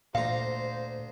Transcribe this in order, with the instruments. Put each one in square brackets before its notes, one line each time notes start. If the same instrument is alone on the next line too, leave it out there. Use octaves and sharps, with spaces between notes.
[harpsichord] D2 A#5 [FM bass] A#2 [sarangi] C5 [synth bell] F5